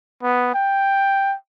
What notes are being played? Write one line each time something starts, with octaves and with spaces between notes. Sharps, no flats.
B3
G5